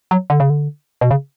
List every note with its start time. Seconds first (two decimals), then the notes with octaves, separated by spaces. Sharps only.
0.11 F#3
0.30 D3
0.40 C#3
0.50 D3
1.01 B2
1.11 C#3